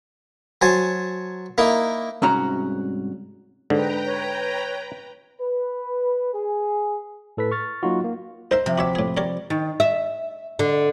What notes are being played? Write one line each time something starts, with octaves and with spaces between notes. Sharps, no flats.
F#3 C5 G#5 A5
A#3 D#4 E4
C2 G#2 C#4 F#4 A#5
G#2 D3 B4 G5 A#5
C#5
B4
G#4
A2 A4 B4 B6
C#6 F6 A6
F#3 A#3 D#4 F4 F#4
A#3
D#4 A#4 C5 E5
C3 F3
F#4 C#5 E5 B5 D6
A2 G#4
G4 A#4 C#5 D5
D#3
E5
D3